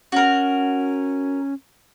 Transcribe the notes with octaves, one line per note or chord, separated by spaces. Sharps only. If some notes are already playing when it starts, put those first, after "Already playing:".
C#4 F#4 A#4